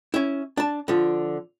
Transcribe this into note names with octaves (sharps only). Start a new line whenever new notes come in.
C#4 E4
D4 A5
D3 F3